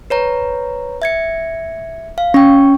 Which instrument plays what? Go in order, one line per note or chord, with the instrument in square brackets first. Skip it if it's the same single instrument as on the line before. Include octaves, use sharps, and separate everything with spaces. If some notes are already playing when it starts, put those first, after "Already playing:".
[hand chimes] B4 C#5 A#5
E5 G#6 C#7
F5
[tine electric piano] C#4 [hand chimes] G5 C#6